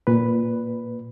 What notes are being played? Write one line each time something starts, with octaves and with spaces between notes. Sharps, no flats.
A#2 B4